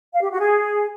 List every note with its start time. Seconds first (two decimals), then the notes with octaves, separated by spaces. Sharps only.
0.13 F5
0.22 G4
0.31 F#4
0.40 G#4